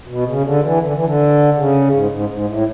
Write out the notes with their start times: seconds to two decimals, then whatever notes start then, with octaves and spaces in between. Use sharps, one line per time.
0.08 B2
0.26 C#3
0.44 D3
0.63 E3
0.82 D3
0.94 E3
1.04 D3
1.55 C#3
1.93 G#2
2.11 G#2
2.29 G#2
2.47 A2